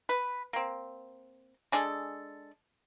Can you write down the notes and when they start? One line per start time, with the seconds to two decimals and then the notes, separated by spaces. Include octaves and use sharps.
0.09 B4
0.53 A#3 C4
1.72 G#3 D4 G#4 A4